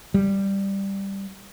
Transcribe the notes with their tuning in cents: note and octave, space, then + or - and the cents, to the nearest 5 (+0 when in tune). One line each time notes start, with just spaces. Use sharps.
G3 +5